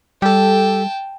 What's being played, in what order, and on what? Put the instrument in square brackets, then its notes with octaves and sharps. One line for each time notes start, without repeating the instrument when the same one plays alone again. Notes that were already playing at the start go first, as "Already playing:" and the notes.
[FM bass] G3 [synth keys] G4 A4 [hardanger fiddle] G5 A5